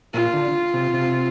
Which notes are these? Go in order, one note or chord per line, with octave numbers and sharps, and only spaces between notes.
A#2 F4
D3
C3
C3